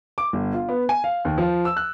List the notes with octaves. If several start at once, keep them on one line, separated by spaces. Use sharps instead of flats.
D6
G1
F4
B3
G#5
F5
D#2
F3
E6
F#6